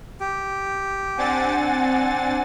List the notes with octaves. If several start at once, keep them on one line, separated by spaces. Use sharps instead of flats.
G4
C4 D4 F#5 G#5 A6